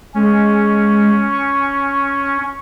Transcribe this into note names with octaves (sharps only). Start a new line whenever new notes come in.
G#3 C#4
C#6